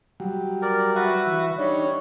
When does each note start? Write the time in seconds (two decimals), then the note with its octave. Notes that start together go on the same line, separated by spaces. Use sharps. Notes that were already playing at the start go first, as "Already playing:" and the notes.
0.20 F#3 G3
0.62 A#4 D5
0.95 F#4 B4 E5
1.26 E3
1.58 G3 D4 D#4 C#5